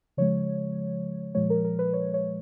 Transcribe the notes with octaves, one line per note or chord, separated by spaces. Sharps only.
C#3 F3 G#3 C#5
A#2 F3 G#3 C#5
A#4
A#4
B4
C#5
C#5